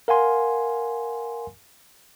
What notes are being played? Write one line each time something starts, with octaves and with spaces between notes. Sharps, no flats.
A#4 F5 F#5 G#5 C6